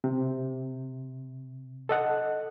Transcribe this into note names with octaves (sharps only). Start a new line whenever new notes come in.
C3
A4 D#5 F#5